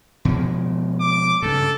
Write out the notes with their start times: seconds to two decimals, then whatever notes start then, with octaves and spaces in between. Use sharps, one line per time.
0.25 B2 F3 G#3
1.00 D6
1.42 G2 C#3 A4